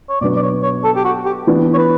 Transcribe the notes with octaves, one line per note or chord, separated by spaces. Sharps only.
C#5
B2 F#3 B3 D4 D5
D5
C#5
C#5
A4
G4
F#4
G4
E3 B3 D4
C#5
B4